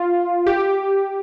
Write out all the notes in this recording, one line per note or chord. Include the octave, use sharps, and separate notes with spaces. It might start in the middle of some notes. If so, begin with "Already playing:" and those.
Already playing: F4
G4